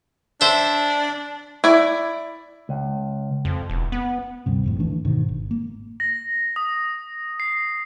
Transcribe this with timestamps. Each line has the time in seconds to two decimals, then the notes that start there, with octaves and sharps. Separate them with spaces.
0.41 D4 C5 E5
1.64 E4 D5
2.69 C#2
3.45 F2
3.70 E1
3.92 B3
4.46 D2 G2 C3
4.64 G#1 F2 A2
4.80 D2 E3 A3 D4
5.05 G#2 B2 D#3
5.29 G#1
5.51 A#3
6.00 A#6
6.56 D#6
7.40 C7